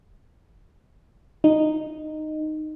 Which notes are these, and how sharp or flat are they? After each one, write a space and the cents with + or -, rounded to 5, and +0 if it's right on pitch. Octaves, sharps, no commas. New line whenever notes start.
D#4 -10